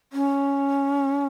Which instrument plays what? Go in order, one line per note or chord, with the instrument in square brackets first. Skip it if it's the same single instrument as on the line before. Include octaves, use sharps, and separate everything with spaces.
[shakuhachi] C#4